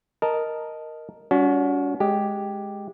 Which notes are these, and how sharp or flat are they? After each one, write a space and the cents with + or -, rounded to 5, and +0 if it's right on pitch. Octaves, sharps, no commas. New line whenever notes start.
A#4 +0 D#5 +0 A5 +0
G3 +5 C#4 +40 F#4 -10
G#3 +0 G4 +0